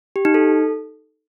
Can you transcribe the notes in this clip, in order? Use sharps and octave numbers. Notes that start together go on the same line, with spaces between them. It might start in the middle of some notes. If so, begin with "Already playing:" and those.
G4
D#4
A4